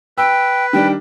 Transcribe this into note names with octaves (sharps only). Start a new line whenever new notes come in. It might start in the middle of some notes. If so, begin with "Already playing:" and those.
B4 G5 E6
D#3 G3 D4 G5